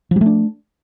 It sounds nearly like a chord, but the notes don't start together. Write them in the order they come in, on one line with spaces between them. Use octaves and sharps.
F3 G3 A3 D4